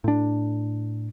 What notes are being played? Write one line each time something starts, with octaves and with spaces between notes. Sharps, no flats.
A2 D4